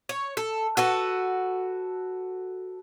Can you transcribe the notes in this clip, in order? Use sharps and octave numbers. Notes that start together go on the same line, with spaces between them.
C#5
A4
F#4 A4 B4